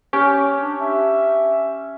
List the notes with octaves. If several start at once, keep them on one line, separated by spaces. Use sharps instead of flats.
C#4 G4
D4
E5